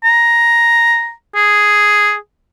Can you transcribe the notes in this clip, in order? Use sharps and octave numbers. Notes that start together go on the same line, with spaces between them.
A#5
G#4